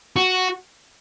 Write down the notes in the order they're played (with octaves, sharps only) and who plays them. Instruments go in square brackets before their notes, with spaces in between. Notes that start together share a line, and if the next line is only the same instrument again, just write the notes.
[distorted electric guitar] F#4